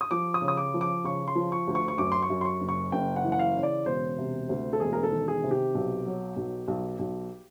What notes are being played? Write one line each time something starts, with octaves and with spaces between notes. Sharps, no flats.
D#6
F3 D6
D#6
C#3
D#6
D6
F3
D6
C#3 C#6
C6
F3
C#6
D2
C#6
C#6
F#2 D6
C6
C#6
F#2
C6
C#6
F#1
C#6
F#1 G5
F#5
E3
F#5
F5
C#3
D5
E1 C5
C3
D2
A4
E1 G#4
A#4
A4
D#3
G#4
C3
G4
B1
F#3
B1
B1
B1